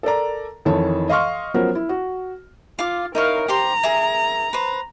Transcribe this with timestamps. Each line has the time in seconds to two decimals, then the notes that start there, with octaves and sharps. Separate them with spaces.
0.03 A4 A#4 D5 A#5
0.65 F2 D#3 E3 C#5 A5
1.09 D#5 F5 C6 C#6 F6
1.54 F3 F#3 B3 C#4 A#4 C5
1.75 E4
1.89 F#4
2.79 F4 F5 D6
3.15 D#4 E4 A#4 C#5 F5
3.48 G4 C5 A#5 C6
3.83 G#4 A#4 E5
4.53 B4 C5